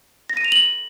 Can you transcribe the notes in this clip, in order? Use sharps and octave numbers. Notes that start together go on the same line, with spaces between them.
A#6
D#7
F7
F#7